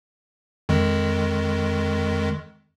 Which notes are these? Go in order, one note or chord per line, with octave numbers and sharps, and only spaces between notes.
F2 D#3 G#3